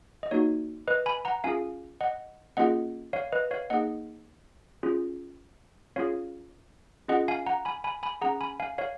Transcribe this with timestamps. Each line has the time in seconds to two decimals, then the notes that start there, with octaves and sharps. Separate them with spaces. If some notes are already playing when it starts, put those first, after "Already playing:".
0.23 D#5
0.31 A#3 D#4 F#4 C#5
0.88 B4 D#5
1.06 G#5 B5
1.25 F#5 A#5
1.44 C#4 F4 G#4 F5 G#5
2.01 D#5 F#5
2.57 A#3 C#4 F4 G#4 D#5 F#5
3.13 C#5 F5
3.32 B4 D#5
3.51 C#5 F5
3.70 A#3 D#4 G#4 D#5 F#5
4.83 C#4 F4 G#4
5.96 C#4 F4 G#4 C#5 F5
7.08 C#4 F4 G#4 D#5 F#5
7.28 F5 G#5
7.46 F#5 A#5
7.65 G#5 B5
7.84 G#5 B5
8.03 G#5 B5
8.21 C#4 G#4 F#5 A#5
8.41 G#5 B5
8.60 F5 G#5
8.78 C#5 F5